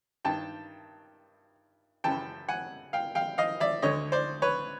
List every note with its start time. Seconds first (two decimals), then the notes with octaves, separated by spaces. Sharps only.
0.25 G2 D#3 G5 A5
2.04 F#2 C#3 E3 G5 A5
2.48 F#5 G#5
2.93 F5 G5
3.15 F5 G5
3.38 D#5 F5
3.60 D5 E5
3.82 D2 D3 C#5 D#5
4.12 C5 D5
4.42 B4 C#5